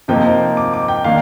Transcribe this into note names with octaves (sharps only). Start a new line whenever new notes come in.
C3 F3 A#3 D#4 G5
D6
D6
G5
D#3 A#3 D4 F5